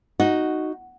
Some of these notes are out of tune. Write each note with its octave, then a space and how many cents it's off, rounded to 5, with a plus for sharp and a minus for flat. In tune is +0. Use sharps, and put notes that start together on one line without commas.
D#4 +0 F#4 +0